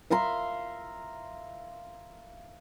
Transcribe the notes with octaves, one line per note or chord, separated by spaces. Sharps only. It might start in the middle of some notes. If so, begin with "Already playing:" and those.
E5 F5 A#5 C6